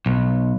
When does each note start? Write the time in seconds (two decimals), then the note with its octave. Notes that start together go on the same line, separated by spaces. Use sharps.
0.06 B1